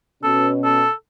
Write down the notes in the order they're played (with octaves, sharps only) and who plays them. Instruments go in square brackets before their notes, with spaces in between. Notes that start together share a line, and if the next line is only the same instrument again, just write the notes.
[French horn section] B2 C#4 [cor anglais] A4
[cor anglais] A4